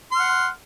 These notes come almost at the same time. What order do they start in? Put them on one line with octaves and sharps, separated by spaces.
C6 F6 F#5